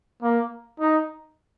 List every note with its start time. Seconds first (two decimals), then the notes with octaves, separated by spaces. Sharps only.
0.23 A#3
0.80 D#4